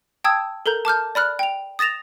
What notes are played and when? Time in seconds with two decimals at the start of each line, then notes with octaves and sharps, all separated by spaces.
0.24 G5 A5 D#6 E6 G#6
0.66 A4 A#4 A#5 G6
0.85 A5 D6 F6 G6
1.15 D5 B5 F6 F#6
1.39 G5 F7
1.79 D#6 A6 A#6 E7 F7